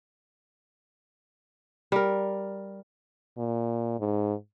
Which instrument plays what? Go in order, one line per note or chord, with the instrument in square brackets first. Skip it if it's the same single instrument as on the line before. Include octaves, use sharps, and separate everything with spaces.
[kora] G3 A#4
[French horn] A#2
G#2